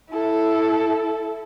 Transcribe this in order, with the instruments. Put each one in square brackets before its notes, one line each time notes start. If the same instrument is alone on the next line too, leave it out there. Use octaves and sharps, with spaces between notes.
[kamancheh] E4 A4